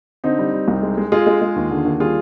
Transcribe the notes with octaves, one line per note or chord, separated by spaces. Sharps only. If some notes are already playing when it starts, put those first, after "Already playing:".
D3 C4 D#4
G3
G3
C2
G#3
G#3
G#3 F4 G#4
G#3
G#3
D#2
D3
D#2
G3 F4 G#4